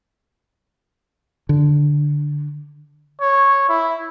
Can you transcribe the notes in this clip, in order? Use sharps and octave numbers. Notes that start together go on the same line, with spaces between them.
D3
C#5
E4